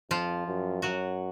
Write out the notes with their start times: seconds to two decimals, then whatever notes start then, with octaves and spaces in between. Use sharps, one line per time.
0.10 F2 F3 F4
0.47 F#2
0.82 F#2 F#3 F#4